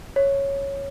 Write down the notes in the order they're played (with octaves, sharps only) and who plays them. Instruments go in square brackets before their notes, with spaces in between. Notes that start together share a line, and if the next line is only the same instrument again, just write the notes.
[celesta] C#5